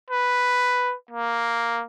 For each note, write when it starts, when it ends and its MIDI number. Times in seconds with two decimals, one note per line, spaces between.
0.10 0.94 71
1.11 1.83 58